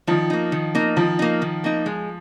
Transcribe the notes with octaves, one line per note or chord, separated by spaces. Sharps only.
D#3 F3
A#3 D#4
D#3
A#3 D#4
D#3 F3
A#3 D#4
D#3
A#3 D#4
G#3